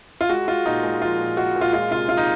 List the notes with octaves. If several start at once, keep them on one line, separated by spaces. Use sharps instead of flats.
F4
G#3 F#4
G#3 F4
A#2 D#4
G#3
F3 F4
A#2
G#3 F#4
A#2
F4
G#3 F4
C3 F4
C3 F4
D#4